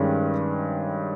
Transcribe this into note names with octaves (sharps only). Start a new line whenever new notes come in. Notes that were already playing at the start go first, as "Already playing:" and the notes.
Already playing: G2 D#3 G#3 C#4 G#4